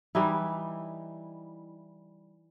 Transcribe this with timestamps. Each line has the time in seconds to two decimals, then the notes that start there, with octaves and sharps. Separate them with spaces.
0.15 E3 G3 D#4 E4